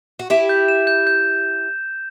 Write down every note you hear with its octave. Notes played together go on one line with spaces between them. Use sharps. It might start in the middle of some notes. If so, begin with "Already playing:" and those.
F#4
E4 G4 E7
G6
E7
G6
G6